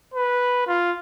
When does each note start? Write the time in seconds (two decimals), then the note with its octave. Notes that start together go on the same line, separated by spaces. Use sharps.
0.14 B4
0.67 F4